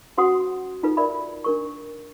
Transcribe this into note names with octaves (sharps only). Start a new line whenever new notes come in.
C#4 F#4 C5 F#5 C6 D#6
D#4 F4 A4 B4
A#4 D5 E5 B5
D4 A#4 C#6